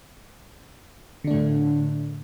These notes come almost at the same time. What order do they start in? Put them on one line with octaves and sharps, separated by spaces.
D3 D4 A3 A2